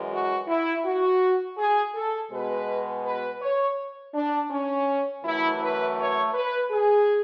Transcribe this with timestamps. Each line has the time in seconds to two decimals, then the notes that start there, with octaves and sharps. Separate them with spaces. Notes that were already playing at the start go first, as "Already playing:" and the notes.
Already playing: F#2 E3 G#3
0.11 F#4
0.47 E4
0.84 F#4
1.57 G#4
1.94 A4
2.31 B2 G#3 B4
3.04 B4
3.41 C#5
4.14 D4
4.50 C#4
5.24 F#2 E3 A3 E4
5.60 B4
5.97 C#5
6.33 B4
6.71 G#4